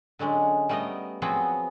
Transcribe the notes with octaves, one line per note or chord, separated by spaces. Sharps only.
D3 F#3 G#3 C#4
G3 A3 B3 A#4 D#5
F3 F#3 B3 C4 F#4 G#4